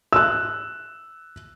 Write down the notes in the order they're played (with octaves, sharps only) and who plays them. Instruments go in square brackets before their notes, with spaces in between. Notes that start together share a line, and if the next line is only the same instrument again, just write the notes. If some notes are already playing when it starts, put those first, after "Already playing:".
[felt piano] E6 F#6